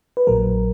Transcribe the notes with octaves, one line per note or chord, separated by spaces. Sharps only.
B4
A#1 A#2 F#3 A#4